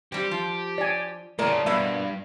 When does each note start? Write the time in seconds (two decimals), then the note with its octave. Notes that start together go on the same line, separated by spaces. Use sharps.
0.12 G3 C4 G4
0.31 F3
0.78 D5 G#5
1.39 A2 C#3 F4 A#4 D5 A5
1.66 G2 B2 A#3 B3 E5